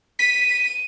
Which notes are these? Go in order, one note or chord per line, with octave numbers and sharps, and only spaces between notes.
B6 D#7